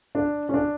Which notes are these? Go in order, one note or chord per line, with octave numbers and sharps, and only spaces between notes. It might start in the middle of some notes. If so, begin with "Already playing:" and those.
D4
C#4
D4